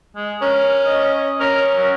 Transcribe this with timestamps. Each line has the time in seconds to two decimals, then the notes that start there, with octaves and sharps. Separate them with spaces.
0.16 G#3
0.42 C#4 A#4
0.86 D#5
1.40 C#4 A#4
1.75 F#3